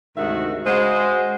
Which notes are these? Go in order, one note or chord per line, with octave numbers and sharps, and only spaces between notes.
D2 G#2 C3 D#3 F#4 E5
C#3 G#3 F#4 C5